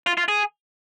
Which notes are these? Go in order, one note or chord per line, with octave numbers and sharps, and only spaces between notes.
F4
F4
G#4